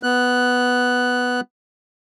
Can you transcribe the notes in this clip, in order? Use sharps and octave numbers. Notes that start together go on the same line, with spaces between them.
B3 F#6